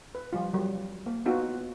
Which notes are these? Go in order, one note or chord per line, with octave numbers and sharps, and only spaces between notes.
B4
F3 G3 F4
F#3 G3
A#3
B3 D#4 F4 F#4